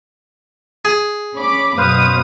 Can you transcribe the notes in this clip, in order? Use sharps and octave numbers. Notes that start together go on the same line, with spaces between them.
G#4
C#4 B5 D6
F#2 B2 B4 C5 F5 D#6